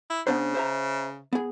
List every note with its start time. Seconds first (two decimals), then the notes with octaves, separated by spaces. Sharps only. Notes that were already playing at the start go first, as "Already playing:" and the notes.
0.10 E4
0.27 C#3 B3 D4 C5
0.55 C5 E5 A#5
1.33 B3 G#4